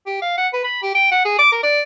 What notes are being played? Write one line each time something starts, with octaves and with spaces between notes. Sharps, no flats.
G4
F5
F#5
B4
B5
G4
G5
F#5
G#4
D6
A#4
D5